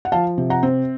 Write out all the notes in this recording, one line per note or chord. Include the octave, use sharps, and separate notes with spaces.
F#5
F3 F5 A5
C3
F#5 A#5
C4